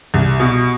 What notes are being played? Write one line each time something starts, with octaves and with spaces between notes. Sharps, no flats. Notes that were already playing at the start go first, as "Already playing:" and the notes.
C2
B2